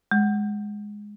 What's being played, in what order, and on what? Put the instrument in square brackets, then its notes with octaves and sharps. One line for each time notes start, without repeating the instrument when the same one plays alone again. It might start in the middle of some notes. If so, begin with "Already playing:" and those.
[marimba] G#3